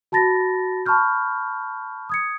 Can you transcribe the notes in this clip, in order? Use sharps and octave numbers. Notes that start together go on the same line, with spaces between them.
F#4 A5 B5 A6 A#6
A5 B5 C#6 F6 G6
D#6 G#6 C#7